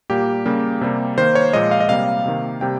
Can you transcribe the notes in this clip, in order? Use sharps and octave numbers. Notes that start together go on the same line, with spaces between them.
A#2 G3 A#3 G4
C#3 G3 A#3
C3 G3 A#3
D#3 A#3 C5
C#5
A#2 F3 G#3 D#5
F5
D#5
C3 G3 A#3 F5
C3 D#3 A#3
C3 G3 A#3 G5